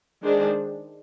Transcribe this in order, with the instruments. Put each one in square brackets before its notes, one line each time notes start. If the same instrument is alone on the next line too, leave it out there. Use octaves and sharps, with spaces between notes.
[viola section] D#3 G#3 D4 G#4 C5